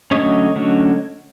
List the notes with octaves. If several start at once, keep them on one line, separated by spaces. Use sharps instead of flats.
D3 F#3 A3 C#4 C#5 D#5
D3 F#3 A3 C#4